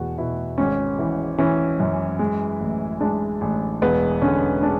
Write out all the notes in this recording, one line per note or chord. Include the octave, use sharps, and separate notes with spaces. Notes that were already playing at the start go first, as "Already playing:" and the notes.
Already playing: E2 B2 F#4
B2 E4
G#1 C#4
E3
E3 C#4
F#2
G#3
A1
G#3 D4
A1
E1 B3
D3 C#4
G#3 D4